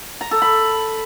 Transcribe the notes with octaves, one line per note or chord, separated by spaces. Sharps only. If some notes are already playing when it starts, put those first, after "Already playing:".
A#5
A4
B5